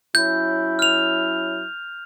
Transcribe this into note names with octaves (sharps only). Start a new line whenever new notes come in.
F#3 C#4 E4 G6
F6 F7